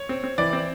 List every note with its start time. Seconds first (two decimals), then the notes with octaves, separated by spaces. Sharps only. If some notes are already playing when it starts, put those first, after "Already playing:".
Already playing: C#5
0.09 C4
0.24 C4
0.38 E3 D5
0.53 C4